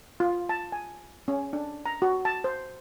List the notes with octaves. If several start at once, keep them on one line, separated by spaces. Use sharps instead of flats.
F4
A5
G#5
C#4
D4
A#5
F#4
A5
C5